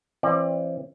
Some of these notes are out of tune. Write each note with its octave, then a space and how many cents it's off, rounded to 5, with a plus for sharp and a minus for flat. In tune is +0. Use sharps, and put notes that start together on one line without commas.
E3 +35 C4 +40 D5 +25